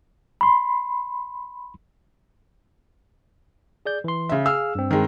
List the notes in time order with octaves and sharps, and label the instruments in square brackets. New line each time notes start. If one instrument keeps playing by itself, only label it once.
[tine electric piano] B5 C6
G#4 D5 G6
E3 C6
[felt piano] C#3 E5
[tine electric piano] G#4 F5 F6 [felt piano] E6
[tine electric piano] G2 C4
[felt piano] D#3 G#3